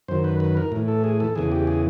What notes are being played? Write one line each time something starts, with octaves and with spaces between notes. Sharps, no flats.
F#2 D#3 C5
B4
B4
A#4
A2 E3
A4
G#4
A4
E2 C#3 E3 G#4
G4
G#4